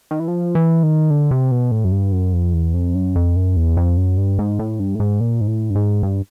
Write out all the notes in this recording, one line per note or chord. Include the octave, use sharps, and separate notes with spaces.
D#3
E3
F3
E3
D#3
D3
C3
B2
A2
F#2
G2
F#2
F2
E2
F2
F#2
F2
F#2
E2
F2
F#2
G2
G#2
A2
G2
A2
G#2
A#2
G#2
A2
G2
G#2
G2